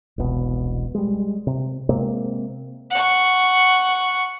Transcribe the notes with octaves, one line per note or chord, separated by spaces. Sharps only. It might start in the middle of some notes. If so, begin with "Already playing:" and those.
E1 C2 B2
G3 G#3
C3
C3 G#3 A#3 C4
F#5 C#6